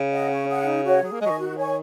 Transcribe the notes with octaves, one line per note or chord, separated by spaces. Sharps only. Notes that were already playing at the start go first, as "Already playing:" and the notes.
Already playing: C#3
D#5 F#5
C#4
G#4 F#5
D#4
F#4 C#5
F#3 G#4
A#3
F#3 G#3 D#5 G#5 C#6
D#3
F#4
C#5 G#5 C#6